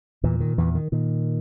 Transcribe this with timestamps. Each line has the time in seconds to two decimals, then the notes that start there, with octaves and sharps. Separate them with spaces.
0.23 E2 A#2 E3
0.40 D#3
0.58 E2 E3
0.75 D#3
0.92 A#2 D#3